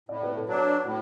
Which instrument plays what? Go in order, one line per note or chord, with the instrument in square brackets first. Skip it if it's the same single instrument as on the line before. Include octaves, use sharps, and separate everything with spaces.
[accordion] A2 [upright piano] D5
[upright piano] B4
A4
[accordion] F#3 D4 [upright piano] B4
[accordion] A2 [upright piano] F#4